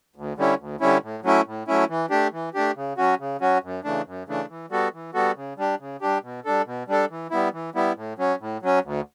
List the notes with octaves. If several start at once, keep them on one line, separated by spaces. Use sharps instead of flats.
D2
D3 G3 C#4 E4
D2
D3 G3 C#4 E4
A2
F#3 A3 C#4 E4
A2
F#3 A3 C#4 E4
E3
A3 D4 G4
E3
A3 D4 G4
C#3
F#3 C#4 F#4
C#3
F#3 C#4 F#4
F#2
C#3 E3 A3 D4
F#2
C#3 E3 A3 D4
E3
G3 B3 F#4 A4
E3
G3 B3 F#4 A4
C#3
G3 D4 G4
C#3
G3 D4 G4
B2
G3 D4 A4
B2
G3 D4 A4
E3
G3 B3 E4
E3
G3 B3 E4
A2
F#3 C#4
A2
F#3 C#4
D2